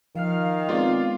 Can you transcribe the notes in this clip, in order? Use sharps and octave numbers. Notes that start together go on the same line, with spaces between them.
D#3 F3 F5 F6
G#3 B3 C4 F4 D5